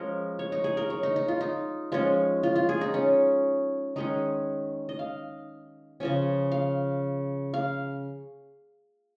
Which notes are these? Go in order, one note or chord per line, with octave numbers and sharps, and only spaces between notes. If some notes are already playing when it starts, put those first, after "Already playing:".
Already playing: F3 G#3 C#4 A#4
C#5
D#4
G#4
A#4
C#5
D#4
D#4
F4
D#4
F3 G#3 C#4
F4
F4
G#4
D#4
C#4
D#3 G#3 C#4 D#4
D#5
F5
C#3 F3 C#4 G#5
F5
F5